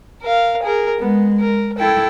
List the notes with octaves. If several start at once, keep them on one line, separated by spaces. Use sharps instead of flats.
A#4 F5
G#4 A#4
G#3 B3
A#4
E4 A4 G5